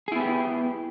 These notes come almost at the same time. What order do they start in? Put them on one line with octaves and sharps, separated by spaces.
G#4 E4 B3 G4